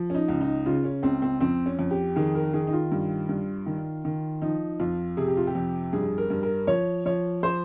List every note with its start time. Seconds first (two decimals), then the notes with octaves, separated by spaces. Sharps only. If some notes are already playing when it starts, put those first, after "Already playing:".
Already playing: F3
0.10 C#4
0.15 D#4
0.28 C#2
0.41 D#4
0.66 C#3 F4
0.84 C#4
1.03 C#2 C4
1.22 C4
1.41 F2 C4
1.66 C#4
1.79 F2
1.91 G4
2.16 D#3 G#4
2.35 A#4
2.53 D#3 G#4
2.67 D#4
2.73 F4
2.92 G2
3.29 G2
3.66 D#3
4.05 D#3
4.42 F3 D#4
4.80 F2 F4
5.17 C3 G#4
5.28 G4
5.37 F4
5.47 G4
5.55 F2
5.93 G2 G#4
6.18 A#4
6.30 G2
6.43 A#4
6.67 F3 C#5
7.06 F3 C#5
7.43 F3 C5